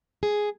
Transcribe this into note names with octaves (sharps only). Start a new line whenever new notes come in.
G#4